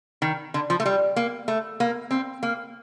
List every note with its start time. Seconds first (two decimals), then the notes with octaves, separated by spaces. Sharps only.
0.22 D#3
0.54 D3
0.70 F3
0.80 A3
0.86 G3
1.16 A#3
1.48 A3
1.80 A#3
2.11 C4
2.43 A#3